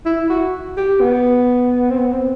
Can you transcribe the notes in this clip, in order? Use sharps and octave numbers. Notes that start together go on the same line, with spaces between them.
E4
F#4
G4
B3
C4
B3
C4